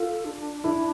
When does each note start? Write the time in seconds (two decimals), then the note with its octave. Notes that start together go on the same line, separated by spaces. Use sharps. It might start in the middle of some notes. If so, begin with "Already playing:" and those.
Already playing: F4 A4
0.25 D4
0.64 E4